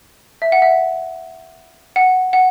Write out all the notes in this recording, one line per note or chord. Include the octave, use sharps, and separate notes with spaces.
E5
F#5
E5
F#5
F#5